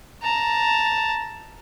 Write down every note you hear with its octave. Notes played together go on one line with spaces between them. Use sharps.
A5 A#5